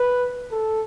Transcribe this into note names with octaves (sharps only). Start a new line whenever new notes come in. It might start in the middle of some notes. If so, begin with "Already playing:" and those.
Already playing: B4
A4